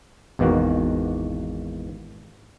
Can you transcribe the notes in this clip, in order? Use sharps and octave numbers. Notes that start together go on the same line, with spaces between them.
G#1 E2 B2 D#3 A#3 F#4